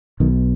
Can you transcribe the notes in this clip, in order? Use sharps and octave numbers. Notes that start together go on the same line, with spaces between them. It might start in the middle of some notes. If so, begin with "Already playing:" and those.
B1 B2 D#3